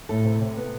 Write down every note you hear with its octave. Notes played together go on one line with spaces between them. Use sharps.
A2 A4
C3
C3
B3